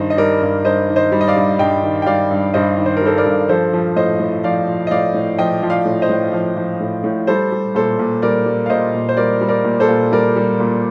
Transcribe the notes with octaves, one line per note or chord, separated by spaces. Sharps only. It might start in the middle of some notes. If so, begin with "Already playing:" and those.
Already playing: G2 D#3 C5 D#5
D#5
G3 A#4 D5
G2
G2 C5 D#5
D#3
C5 D#5
G3
D#5
D5 F5
G2
G2 D#5 G5
D#3
G5
G3 D5 F5
G2
G2 C5 D#5
D#3
C5
A#4
G3 A4 C5
A#4 D5
G2
F3 A4 C5
F3
A2 C5 D#5
A2
F3 D5 F5
F3
D#5
A2 D5 F5
A2
F3 D#5 G5
F3
D5 F5
A2
C5 D#5
A2
F3
F3
A2
A2
G3 A4 C5
G3
A#2 A4 C5
A#2
G3 A#4 D5
G3
F5
A#2 C5 D#5
A#2
C5
G3 A#4 D5
G3
A#4 D5
A#2
A4 C5
A#2
G3 A#4 D5
G3
A#2